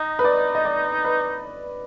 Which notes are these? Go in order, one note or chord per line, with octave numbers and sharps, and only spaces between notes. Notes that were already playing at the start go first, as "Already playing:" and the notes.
Already playing: D#4 D#5
B4
D5
D#5
D5
B4